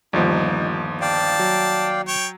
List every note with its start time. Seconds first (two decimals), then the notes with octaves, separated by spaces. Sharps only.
0.13 G1 D#2 F3 G3 D#4
1.01 D5 F5 G5 A5
1.39 F#3
2.08 C#5 G5